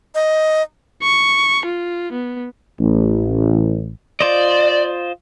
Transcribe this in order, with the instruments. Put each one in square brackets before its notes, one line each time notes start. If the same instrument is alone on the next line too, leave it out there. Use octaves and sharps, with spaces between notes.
[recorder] D#5
[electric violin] C#6
F4
B3
[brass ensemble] A1
[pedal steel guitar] F4 C5 D#5 [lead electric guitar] D5